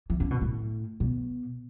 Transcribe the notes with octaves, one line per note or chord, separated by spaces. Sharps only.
E3
C#3
B2
A2
B2